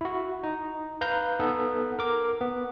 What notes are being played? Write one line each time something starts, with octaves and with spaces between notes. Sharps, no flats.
E4 F#4
D#4
B4 F5 A#5 G6
B3 D#4 A4
A#4 D6
B3